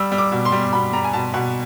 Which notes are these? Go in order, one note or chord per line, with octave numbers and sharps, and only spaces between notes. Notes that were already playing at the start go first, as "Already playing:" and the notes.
Already playing: G3 E6
G3
D6
B2
C6
G3
B2 B5
G3 A#5
G#5
B2 A5
B2 F#5